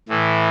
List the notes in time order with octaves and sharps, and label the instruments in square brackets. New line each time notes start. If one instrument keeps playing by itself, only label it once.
[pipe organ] A2 E3